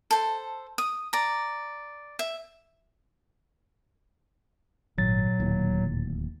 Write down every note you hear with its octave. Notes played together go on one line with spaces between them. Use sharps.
A4 C5
D#6
D5 A#5
E5
G#1 A#2 F#3 A6
D1 D#2